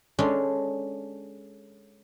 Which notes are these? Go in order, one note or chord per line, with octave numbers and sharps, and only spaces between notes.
G#3 C#4 D4 G#4 A4